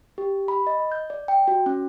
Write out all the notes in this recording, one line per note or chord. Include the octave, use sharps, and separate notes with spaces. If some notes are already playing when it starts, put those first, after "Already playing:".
G4
B5
D#5
G6
D5
G5
F#4
C#4